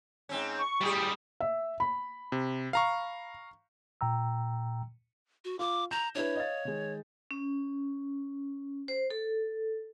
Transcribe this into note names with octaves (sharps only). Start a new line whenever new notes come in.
G#2 C4 C#4
C#6
A2 G3 G4 G#4
E5
B5
C3
F5 A#5 C#6
A#2 G5 A#5 E6
F#4
F4 D6
A#5 G6 A#6 E7
D4 E4 B4 C#5
D#5 F5 A6
D#3 G#3
C#4
C5
A4